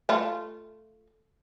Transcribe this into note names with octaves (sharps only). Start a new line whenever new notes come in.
A3 F4